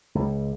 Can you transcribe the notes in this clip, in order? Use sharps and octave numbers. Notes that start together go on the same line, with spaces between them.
C#2